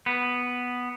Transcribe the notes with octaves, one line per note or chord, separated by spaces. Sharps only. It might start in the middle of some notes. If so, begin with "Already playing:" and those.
B3